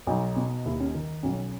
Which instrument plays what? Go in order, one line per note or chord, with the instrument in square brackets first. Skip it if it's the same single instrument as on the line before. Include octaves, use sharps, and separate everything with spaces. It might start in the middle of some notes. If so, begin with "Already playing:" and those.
[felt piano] B1 D#4
B2
D#2 E4
D#4
C#4
D#4
D#3
B1 C#4